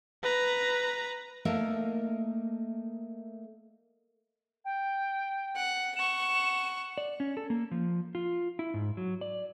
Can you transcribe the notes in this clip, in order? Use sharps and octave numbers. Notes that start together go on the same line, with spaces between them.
B4 A#5
A3 A#3 D#4 A4 A#4
G5
F#5
F#5 C#6 E7
D5
C#4
A4
A#3
F3
F4
E4
G#2
F#3
D5